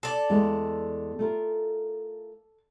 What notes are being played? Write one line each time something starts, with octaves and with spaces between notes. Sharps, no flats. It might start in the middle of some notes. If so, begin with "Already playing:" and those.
A4 D5
E2 G#3 A3
A3 F4 A#4